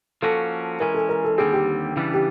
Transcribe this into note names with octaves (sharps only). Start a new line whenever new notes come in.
F3 A#3 C#4 F#4 A4
E3 G#3 C#4 A#4
A4
A#4
A4
D#2 D3 G3 C4 G#4
G4
C#3 E3 G3 B3 D4
G4